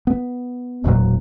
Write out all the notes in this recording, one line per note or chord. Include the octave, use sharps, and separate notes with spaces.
B3
E1 D2 A#2 F#3